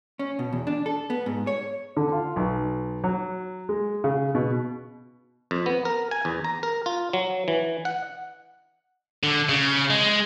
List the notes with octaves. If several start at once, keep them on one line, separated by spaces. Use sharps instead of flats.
C#4
B2
E2
D4
A4
B3
G#2
C#5
D3
F4
B1
F#3
G#3
C#3
B2
F2
B3
A#4
G#5
E2
A#5
A#4
F4
F#3
E3
F#5
D3
C#3
G#3